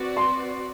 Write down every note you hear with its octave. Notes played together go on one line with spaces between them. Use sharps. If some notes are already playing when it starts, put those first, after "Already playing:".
Already playing: C4 F#4 B4 D5
C6